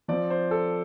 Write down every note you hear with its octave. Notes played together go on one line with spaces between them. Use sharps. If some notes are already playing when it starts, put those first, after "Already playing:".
F3 C4 D5
C5
A4